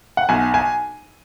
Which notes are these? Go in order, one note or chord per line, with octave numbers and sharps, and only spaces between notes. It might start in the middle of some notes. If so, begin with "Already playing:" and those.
F#5
B1 G#5
G#5